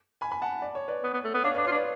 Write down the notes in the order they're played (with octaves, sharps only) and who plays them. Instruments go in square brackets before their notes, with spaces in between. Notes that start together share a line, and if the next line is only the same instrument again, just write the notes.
[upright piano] G#5 B5
G#5 B5
F#5 A5
D5
C#5
B4 D5
[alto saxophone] B3
B3
A3
B3
[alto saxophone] D4 [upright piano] C#5 F5
[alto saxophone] D4 [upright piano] B4 D5
[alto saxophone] F4 [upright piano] C#5
[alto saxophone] D4
[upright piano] B4 D5